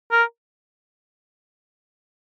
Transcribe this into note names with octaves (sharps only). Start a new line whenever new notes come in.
A#4